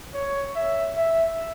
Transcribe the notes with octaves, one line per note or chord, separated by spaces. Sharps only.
C#5
E5
E5